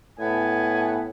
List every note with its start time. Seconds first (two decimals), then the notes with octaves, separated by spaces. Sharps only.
0.19 A2 B3 G#5